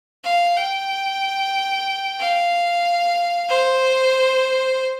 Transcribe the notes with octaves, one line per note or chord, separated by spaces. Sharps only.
F5
G5
F5
C5